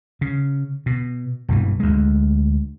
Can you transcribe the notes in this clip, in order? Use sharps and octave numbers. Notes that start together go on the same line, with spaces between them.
C#3
B2
E1 G2 E3
D2 G#3